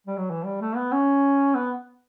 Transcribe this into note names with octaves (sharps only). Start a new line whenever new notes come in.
G3
F#3
E3
G3
A3
B3
C#4
B3